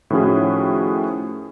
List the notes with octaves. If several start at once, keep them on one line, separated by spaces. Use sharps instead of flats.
A2 D#3 F3 C#4 F#4 G#4